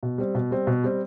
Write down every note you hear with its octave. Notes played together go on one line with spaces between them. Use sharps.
B2
G3 C4
B2
G3 C4
B2
G3 C4